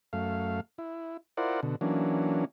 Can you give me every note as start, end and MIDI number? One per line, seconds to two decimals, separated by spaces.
0.13 0.60 42
0.13 0.60 57
0.13 0.60 77
0.78 1.17 64
1.37 1.60 64
1.37 1.60 65
1.37 1.60 70
1.37 1.60 72
1.37 1.60 74
1.37 1.60 78
1.63 1.76 47
1.63 1.76 50
1.81 2.45 52
1.81 2.45 54
1.81 2.45 58
1.81 2.45 61
1.81 2.45 62